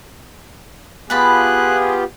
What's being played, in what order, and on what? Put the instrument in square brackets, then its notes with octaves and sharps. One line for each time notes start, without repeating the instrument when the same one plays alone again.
[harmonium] B3 F4 G4 [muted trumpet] G#4 [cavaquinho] B4 A5 B5 [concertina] F#6